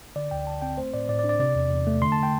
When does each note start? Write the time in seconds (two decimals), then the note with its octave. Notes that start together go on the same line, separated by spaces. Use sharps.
0.16 D3 D5
0.31 D2 G5
0.47 D2 A5
0.62 C4 G5
0.78 A3 C5
0.93 A2 D5
1.09 A2 D5
1.19 D5
1.24 D4
1.29 D5
1.40 C3 D5
1.55 E2
1.71 E2
1.87 A3
2.02 D3 C6
2.12 A5
2.23 G5